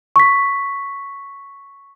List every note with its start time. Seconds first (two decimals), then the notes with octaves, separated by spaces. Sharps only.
0.16 C#6 B6